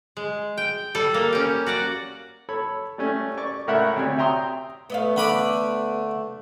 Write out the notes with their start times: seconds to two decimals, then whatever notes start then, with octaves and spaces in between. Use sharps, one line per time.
0.17 G#3
0.57 G5
0.95 G3 A4
1.14 A#3
1.33 C#4 G4
1.66 F#4 D5 F#5
2.49 A4 C#5 B5
2.98 G3 A3 C#4
3.38 D5 C#6
3.67 C#2 A2 A#4 E5 F#5 B5
3.96 D2 C3 C#5 D5
4.18 E5 G5 A#5 C6 D#6
4.90 A3 B3 D#5 F5
5.16 D3 B5 D6